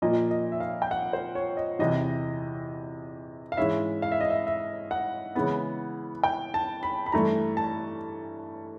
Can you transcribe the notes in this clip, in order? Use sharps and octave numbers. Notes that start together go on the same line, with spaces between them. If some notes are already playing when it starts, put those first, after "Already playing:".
A#2 F3 A#3 D#5
D#5
E5
F5
G5
F#5
C5
C#5
D#5
E2 C3 E3 D#5
F5
G#2 E3 G#3 C#4 E4 E5
F5
E5
D#5
E5
E5
F#5
C#3 E3 G#3 B3
G5
A5
B5
B5
G2 E3 A3 A#5
A5